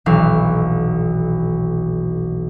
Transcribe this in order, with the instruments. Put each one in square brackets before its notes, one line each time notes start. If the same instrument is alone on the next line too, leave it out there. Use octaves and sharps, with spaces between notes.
[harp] D#1 B1 E3 E4 F5